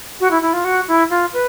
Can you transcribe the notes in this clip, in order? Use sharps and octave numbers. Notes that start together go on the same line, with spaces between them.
F#4
E4
E4
F4
F#4
E4
F4
B4